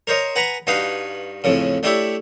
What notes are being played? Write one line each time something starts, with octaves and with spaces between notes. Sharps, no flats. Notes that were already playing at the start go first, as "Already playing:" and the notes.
A#4 C5 C#5 D#5
B4 F#5 G#5 A#5 B5
G2 D#4 F#4 B4 F5 D#6
F2 A2 C#3
A3 D4 E4 G4 C#5 E5